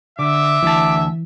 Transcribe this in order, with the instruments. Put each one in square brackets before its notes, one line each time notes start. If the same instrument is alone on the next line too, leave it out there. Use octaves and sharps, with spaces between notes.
[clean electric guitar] D3 [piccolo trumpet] E5 [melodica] D6
[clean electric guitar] D2 A5 [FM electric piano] E3